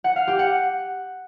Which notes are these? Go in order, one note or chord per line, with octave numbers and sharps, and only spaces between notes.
F#5
F5
G4
F#5